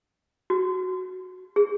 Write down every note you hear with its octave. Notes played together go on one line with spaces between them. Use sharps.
F#4
G#4